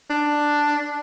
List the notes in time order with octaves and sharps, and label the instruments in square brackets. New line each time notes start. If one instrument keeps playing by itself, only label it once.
[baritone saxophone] D4